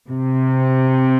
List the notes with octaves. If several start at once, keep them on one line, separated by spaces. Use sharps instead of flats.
C3